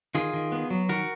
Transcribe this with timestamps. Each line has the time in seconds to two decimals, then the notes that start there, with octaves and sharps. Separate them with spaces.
0.15 D#3 F4 G#4
0.33 D#3
0.52 B3
0.70 F#3
0.89 D#3 F#4 A#4